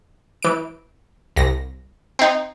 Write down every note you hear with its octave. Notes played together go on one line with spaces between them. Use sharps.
E3 D7
C2 A#6
C4 D#4